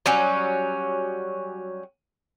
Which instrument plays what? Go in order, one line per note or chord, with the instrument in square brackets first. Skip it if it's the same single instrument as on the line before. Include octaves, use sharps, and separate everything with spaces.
[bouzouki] F#3 G3 C#4